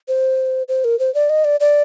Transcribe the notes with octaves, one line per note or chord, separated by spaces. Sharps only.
C5
C5
A#4
C5
D5
D#5
D5
D5